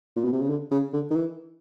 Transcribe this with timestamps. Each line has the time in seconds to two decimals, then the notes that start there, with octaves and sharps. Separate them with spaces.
0.16 A#2
0.24 B2
0.33 C3
0.41 C#3
0.49 D3
0.71 C#3
0.93 D3
1.10 D#3
1.15 E3